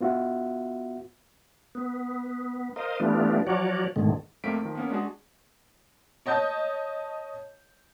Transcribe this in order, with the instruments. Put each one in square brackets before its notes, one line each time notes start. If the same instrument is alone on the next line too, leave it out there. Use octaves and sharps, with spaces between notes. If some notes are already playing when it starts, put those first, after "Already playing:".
[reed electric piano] B3 F4 F#4 E5 F#5
[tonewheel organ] B3
A#4 C5 D#5 F5 D#6
E3 G3 A3 B3 D4 F4
F3 F#3 F#4 C#5 D5
G#2 B2 D3 D#3 G#3 A3
[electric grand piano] F2 A3 A#3 C4 B6 D7
D#3 F3
A#3 B3 C#4
G#3 D4 F#4 G#4
[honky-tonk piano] C#5 D#5 A5 G6